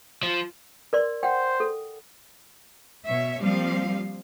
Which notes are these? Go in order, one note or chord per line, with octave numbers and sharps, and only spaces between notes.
F3
A#4 D5 C6
C5 F#5 G5
A4
B2 C#5 E5
F3 G3 A#3 C4 F5